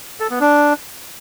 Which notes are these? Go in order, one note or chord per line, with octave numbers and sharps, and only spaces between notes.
A4
B3
D4